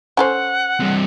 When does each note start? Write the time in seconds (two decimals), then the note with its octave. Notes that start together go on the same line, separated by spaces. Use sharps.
0.17 C#4 A4 C5 F#5
0.80 G2 C4